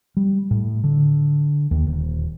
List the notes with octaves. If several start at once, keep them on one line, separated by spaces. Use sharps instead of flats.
G3
A2
D3
D#2
D#1